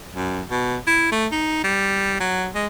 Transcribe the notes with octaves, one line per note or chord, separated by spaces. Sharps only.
F#2
B2
E4
A3
D#4
G3
F#3
G#3